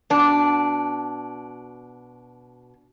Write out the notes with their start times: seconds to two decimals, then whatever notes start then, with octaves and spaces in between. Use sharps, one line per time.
0.10 B2 D4